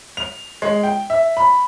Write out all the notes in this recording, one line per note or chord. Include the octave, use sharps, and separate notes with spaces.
F7
G#3
G5
E5
B5